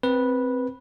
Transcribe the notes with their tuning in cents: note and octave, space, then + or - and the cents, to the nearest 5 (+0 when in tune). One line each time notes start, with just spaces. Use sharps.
C4 +0 B4 -10